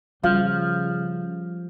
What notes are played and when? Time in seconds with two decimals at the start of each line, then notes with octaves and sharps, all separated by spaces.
0.23 C#3 F3 G3 F4